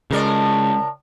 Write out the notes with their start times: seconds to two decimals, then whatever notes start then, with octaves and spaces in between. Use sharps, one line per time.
0.11 A2 C#3 G#3 A#4 D5